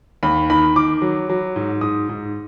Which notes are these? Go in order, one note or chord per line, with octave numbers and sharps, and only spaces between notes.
D#2 B5
D#3 B5
D#3 D6
F#3
F#3
G#2
G#2 D#6
G#2